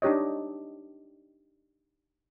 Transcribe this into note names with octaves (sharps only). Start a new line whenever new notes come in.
D4 D#4 G4 C#5 D#5